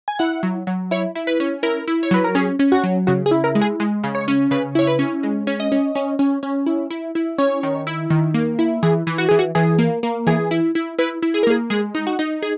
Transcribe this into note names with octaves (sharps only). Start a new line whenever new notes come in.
G#5
E4 F#5
F#3
F#3
E4 C#5
E4
B4
C#4
E4 A#4
E4
C#5
F#3 B4
A#4
C#4 G#4
C#4
F#4
F#3
C#3 F#4
G#4
E4
A#4
G#3
G#4
G#3
C#3
C#5
C#4
C#3 B4
E4 C#5
B4
C#4
G#3
C#4
D#5
C#4
C#4
C#4
C#4
E4
E4
E4
C#4 C#5
D#3
E4
D#3
A#3
E4
E3 G#4
E3
F#4
E3 G#4
F#4
E3 G#4
A#3
A#3
E3 G#4
E4
E4
E4 B4
E4
G#4
A#4
A#3 G#4
G#3 G#4
D#4
F#4
D#4
G#4